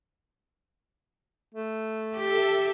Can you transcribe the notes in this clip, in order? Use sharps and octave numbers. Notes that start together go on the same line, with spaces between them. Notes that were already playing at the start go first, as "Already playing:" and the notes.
A3
G4 A4 E5